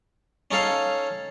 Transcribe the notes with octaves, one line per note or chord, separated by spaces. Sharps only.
C#4 D#4 A4 F5